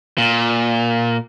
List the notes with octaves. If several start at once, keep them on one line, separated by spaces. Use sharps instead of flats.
A#2